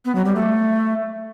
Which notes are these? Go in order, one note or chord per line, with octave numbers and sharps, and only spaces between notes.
B3
F#3
G3
A3